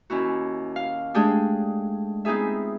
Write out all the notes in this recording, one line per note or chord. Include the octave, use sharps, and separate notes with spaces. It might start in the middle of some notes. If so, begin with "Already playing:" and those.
D#2 C#4 E4 F#4
F5
G#3 A3 D4 G4 G#4
B3 C4 D#4 F4 G#4 E5